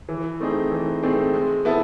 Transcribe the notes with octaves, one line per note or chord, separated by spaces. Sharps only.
E3
A3 C4 D#4 G#4
E3
A3 C4 D#4 G#4
G#3
B3 E4 A4